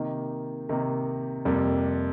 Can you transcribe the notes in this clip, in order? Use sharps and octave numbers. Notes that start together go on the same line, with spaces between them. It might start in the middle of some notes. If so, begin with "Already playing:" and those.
Already playing: C3 D#3 A#3 D#4
C3 D#3 A#3 D#4
F2 C3 G3 A#3